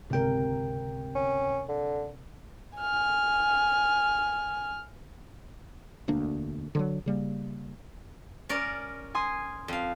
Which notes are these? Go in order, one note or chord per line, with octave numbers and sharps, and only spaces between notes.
G1 C#2 C3 A#4 G5
C#4
D3
G#5 F6
E1 D2 A#3 D4
D3 F3 F#3
C#3 G3 A#3
C#4 A#4 D5
G#5 C6 D#6
F2 F5